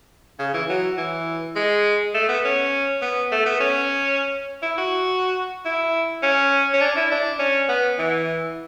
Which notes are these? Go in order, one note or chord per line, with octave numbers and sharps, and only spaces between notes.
C#3
E3
F#3
E3
G#3
A3
B3
C#4
B3
A3
B3
C#4
E4
F#4
E4
C#4
C#4
D4
E4
D4
C#4
B3
E3